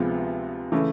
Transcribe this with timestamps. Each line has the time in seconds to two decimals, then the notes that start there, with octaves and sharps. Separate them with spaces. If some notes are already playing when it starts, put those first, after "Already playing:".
Already playing: D2 C3 F3 G#3 B3
0.72 C#3 E3 A3